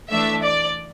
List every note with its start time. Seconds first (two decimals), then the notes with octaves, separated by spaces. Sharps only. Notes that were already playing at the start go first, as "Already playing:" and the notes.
0.11 E3 A3 D4 E5
0.44 D5